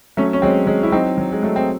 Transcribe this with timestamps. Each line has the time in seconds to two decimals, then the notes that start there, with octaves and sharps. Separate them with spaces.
0.17 F#3 A3 C#4
0.33 C#4
0.42 F#3 G#3 C4
0.67 F#3 G#3
0.83 E4
0.92 F#3 C4 D#4
1.18 F#3
1.32 G#3
1.43 F#3 A3
1.56 C4